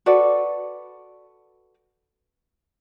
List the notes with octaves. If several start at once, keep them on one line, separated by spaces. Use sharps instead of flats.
F#4 A4 B4 D5